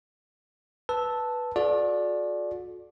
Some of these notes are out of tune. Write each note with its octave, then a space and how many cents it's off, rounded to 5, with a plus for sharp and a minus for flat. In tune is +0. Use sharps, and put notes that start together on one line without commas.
B4 -5 A5 +0 E6 -10
F#4 -45 A4 -45 D5 +0